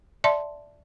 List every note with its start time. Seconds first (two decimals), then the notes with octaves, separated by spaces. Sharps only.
0.24 D5 E5 A5 C6